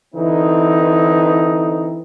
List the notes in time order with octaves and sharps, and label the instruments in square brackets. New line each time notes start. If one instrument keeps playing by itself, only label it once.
[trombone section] D3 E3 C4 D#4